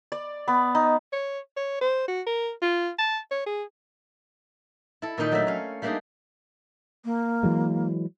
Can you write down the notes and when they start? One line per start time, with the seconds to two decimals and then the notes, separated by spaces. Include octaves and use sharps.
0.12 D5
0.48 B3
0.75 D#4
1.12 C#5
1.57 C#5
1.81 C5
2.08 F#4
2.27 A#4
2.62 F4
2.99 A5
3.31 C#5
3.46 G#4
5.02 E4 A4
5.18 A#2 D#3 D#4 G5 B5
5.32 F#3 A3 D4 E5 A5
5.47 C#4 C#5 F5
5.82 G3 A3 A#3 D4 D#4 G#4
7.05 A#3
7.43 E3 F#3 G#3